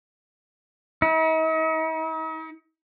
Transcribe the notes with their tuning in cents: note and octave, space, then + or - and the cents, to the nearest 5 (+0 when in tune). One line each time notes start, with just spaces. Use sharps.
D#4 +45